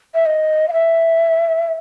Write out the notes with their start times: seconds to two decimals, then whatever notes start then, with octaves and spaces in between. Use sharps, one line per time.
0.15 E5
0.26 D#5
0.68 F5
0.73 E5